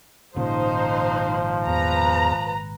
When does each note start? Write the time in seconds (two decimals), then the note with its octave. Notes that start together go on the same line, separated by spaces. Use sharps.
0.36 G#1 A#2 C#3 F3 D#4 C5
1.67 E2 B4 A#5